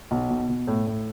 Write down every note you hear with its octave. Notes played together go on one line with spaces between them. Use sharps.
B1
B2
B2
A2
A2